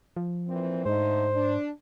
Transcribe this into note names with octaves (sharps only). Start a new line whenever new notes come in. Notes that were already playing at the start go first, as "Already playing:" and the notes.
F3
A#2 E3 C4
G#2 D3 A3 D#4 C5
D4